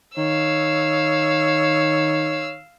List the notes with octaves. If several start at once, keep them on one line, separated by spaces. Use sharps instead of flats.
D#3 C#5 F5 E6